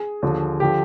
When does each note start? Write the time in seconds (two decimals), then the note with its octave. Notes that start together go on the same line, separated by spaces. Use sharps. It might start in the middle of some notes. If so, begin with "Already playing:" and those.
Already playing: G#4
0.23 D#2 D3 F3
0.60 D3 F3 G4